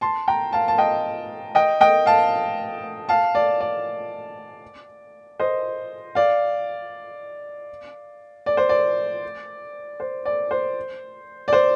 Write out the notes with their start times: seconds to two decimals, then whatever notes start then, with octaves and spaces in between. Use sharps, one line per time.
0.01 A5 C6
0.28 G5 A#5
0.53 F5 A5
0.68 A5
0.78 D#5 G5
1.55 D#5 G5
1.81 D#5 G5
2.06 F5 A5
3.09 F5 A5
3.35 D5
3.61 D5
5.40 C5 D#5
6.15 D5 F5
8.46 D5
8.57 C5
8.69 D5
10.00 C5
10.25 D5
10.51 C5
11.48 D5
11.53 C5